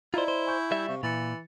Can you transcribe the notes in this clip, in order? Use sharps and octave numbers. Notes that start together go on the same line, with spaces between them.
E4 F4 C5 D5 D#5 A#5
C5
G#5 C#6 G6
G3 E5
C3 F5 C#6
A#2 E3 A6 C#7